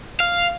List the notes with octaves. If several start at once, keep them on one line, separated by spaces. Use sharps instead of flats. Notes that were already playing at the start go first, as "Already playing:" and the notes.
F5